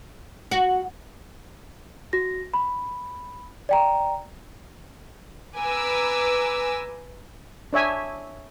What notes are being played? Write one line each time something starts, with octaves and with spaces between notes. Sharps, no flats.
F#4
F#4 A#6
B5
D5 G5 A#5
B4 G#5 A#5 D6 E6
D4 C#5 E5 G#5